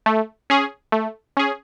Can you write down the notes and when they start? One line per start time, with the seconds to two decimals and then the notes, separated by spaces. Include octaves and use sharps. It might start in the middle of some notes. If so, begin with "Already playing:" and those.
0.06 A3
0.50 C#4 G#4
0.92 A3
1.37 C#4 G#4